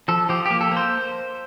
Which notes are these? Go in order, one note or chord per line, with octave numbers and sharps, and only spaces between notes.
F3 A4
F3 G4
A#3 G4
A4
A#3
C5